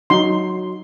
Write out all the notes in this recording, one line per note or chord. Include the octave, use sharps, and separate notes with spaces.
F#3 D#4 C6